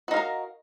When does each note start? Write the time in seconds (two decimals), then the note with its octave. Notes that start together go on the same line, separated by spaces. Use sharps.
0.08 F#4
0.11 D#4
0.14 F5
0.17 A#4